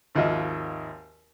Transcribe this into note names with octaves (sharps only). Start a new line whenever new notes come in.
G#1 D#2 F3 D#5 E5